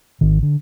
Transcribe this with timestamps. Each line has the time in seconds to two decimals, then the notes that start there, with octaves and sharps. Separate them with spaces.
0.21 G#1 D#3
0.43 D3